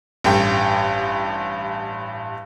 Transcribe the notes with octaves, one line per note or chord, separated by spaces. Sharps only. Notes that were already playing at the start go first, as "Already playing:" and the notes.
A1 G2 G4 G5